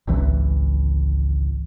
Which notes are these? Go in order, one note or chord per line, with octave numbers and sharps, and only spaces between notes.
G#1 C#2 E3